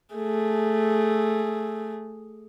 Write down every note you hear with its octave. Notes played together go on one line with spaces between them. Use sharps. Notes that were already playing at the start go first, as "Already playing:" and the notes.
A3 G#4